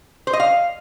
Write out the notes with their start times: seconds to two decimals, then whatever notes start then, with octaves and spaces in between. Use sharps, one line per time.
0.27 C5
0.33 D#5
0.40 F5